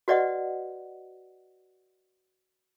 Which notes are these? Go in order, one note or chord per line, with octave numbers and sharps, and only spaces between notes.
F#4 B4 D5 D#5 F#5